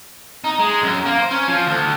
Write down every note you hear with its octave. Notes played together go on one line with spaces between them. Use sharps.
D#4
G#3
F#2
A#3
C5
C#4
F3
D2